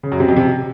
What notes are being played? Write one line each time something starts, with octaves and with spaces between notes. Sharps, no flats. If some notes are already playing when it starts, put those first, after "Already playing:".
C#3
F#2
C3
F2
C3